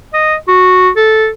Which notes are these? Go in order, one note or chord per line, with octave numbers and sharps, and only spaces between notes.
D#5
F#4
A4